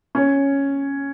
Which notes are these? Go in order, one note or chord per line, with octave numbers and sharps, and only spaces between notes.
C#4